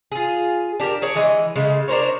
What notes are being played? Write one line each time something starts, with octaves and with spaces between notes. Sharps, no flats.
F4 G#4
D4 G4 A4 A#4
G#4 C#5 D5
E3 G#3 D#5
C#3 G#3 A3
D4 A#4 C5 C#5